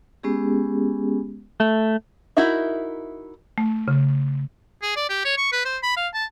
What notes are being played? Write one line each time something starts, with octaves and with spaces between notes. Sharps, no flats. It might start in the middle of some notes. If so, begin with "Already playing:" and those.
G#3 B3 C#4 G4 G#4
A3
D#4 E4 F#4 A#4 E5
A3
C#3
G#4
D5
G4
C#5
C#6
B4
C5
B5
F5
A5